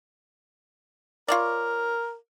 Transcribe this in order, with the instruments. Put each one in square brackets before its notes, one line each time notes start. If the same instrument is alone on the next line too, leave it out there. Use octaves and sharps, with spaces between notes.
[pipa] F4 C#5 D5 [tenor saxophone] A#4